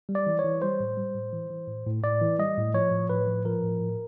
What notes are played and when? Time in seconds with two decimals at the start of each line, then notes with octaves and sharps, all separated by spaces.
0.09 G3
0.15 D5
0.27 E3
0.39 C#5
0.44 E3
0.62 G3 C5
0.80 A2
0.97 G3
1.15 A2
1.33 E3
1.50 E3
1.68 A2
1.86 A2
2.03 A2 D5
2.21 E3
2.39 G3 D#5
2.57 A2
2.74 F3 C#5
2.91 A2
3.10 A2 B4
3.27 F3
3.45 F3 A#4
3.63 A2
3.80 A2